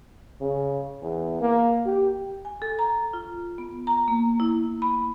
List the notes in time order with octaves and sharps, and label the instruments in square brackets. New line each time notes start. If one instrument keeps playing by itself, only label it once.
[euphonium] C#3
E2
A#3
G4
[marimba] G#5
A4
A#5
F4
B3
A#5
A#3
E4
B5